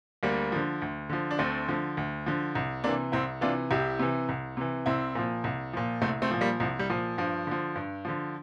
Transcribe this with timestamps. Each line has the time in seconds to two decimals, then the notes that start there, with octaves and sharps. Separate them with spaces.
0.23 D2 G3 A#3
0.52 D3 F3
0.82 D2
1.09 D3 F3
1.31 D4
1.38 D2 A3 C4
1.68 D3 F3
1.97 D2
2.26 D3 F3
2.55 C2
2.84 C3 E3 A#3 D4
3.12 C2 C4 E4
3.41 C3 E3 D4 F4
3.71 C2 E4 G4
3.99 C3 E3
4.29 C2
4.57 C3 E3
4.86 C2 C4 E4
5.15 A#2 F3
5.44 C2
5.73 A#2 F3
6.02 C2 A3 C4
6.22 A3 C4
6.31 A#2 F3
6.41 G3 A#3
6.60 C2 F3
6.79 G3
6.90 A#2 F3
7.18 G2 F3
7.47 D3 F3
7.76 G2
8.05 D3 F3